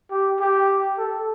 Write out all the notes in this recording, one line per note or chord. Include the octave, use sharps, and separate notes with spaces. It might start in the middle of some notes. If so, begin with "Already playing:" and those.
G4
G4
A4